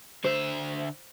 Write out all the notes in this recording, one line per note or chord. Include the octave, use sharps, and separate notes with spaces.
D3 C5 E5